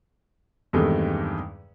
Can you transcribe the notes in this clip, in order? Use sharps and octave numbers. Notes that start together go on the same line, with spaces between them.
E2 G2 C3 D#3 G#3 A3